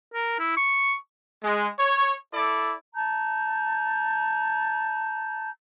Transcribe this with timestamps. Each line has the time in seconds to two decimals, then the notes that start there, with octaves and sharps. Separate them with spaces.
0.14 A#4
0.39 E4
0.57 C#6
1.43 G#3
1.78 C#5
2.33 E4 A4 D5
2.95 A5 A#5 G6